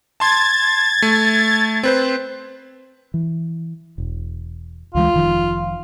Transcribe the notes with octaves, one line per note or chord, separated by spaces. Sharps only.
A5 C6 G#6 A6
A3
C4 B4 C5
E3
E1
D2 E3 G#3 F4
F1 D#3 F3